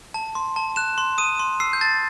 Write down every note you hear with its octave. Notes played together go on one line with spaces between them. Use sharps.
A5
C6
A5
F#6 E7
C6
D#6 D#7
C6
E6 C7
G6
A5 A6